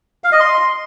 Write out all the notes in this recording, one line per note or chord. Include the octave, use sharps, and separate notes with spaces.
F5
D#5
C6